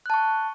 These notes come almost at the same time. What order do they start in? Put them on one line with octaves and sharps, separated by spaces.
F#6 A5 C#6